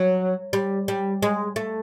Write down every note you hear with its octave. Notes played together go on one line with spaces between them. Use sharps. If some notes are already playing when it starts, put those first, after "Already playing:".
Already playing: F#3
G3
G3
G#3
A3